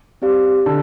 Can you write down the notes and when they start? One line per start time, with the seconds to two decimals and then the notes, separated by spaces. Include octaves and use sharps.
0.22 C4 G4 D5 F5
0.66 D3 A5